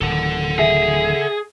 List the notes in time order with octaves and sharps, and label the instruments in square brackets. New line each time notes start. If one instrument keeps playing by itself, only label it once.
[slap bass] D1 D#3 [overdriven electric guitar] A4 F#5
[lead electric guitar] G#4 [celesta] E5 G#5